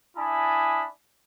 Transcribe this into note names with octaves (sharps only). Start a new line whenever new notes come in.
D4 E4 G#5 A5 B5 D#6